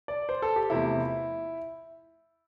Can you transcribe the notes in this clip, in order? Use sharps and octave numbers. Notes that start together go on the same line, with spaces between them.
D5
C5
A4
G4
E2 C3 F3 A3 E4